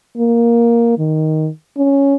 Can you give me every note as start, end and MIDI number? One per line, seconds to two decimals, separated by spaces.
0.18 0.98 58
0.98 1.49 51
1.78 2.15 61